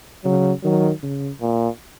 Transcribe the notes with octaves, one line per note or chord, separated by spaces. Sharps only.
C#3 F#3
D#3 F#3
C#3
A#2